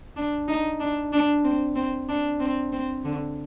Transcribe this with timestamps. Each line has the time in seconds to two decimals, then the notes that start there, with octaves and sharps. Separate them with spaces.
0.16 D4
0.48 D#4
0.80 D4
1.12 D4
1.44 C4
1.76 C4
2.09 D4
2.40 C4
2.72 C4
3.05 D3